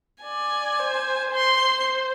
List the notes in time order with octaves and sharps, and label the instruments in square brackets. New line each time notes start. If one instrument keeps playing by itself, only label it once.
[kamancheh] D5 [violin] G#5
[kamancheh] C5
[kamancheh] C5 [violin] C6